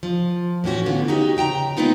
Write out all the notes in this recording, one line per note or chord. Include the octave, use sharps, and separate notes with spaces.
F3
A2 E3 C#4 F#4
D3 B3 F4
D#4 F#4 G4
C#3 G5 A5 A#5
G#3 A#3 B3 D#4 F4